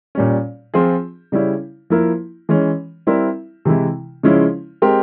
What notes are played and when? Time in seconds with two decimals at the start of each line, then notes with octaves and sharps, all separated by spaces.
0.15 A#2 G3 C#4
0.74 F3 C4 F4 G#4
1.32 C#3 G3 C#4 E4
1.90 F3 A#3 E4 A#4
2.49 E3 G#3 C#4
3.07 G3 C4 E4 A#4 E5
3.65 C3 E3 G#3 E4
4.23 C#3 F3 G#3 C#4 E4
4.82 G#3 C4 G4 A#4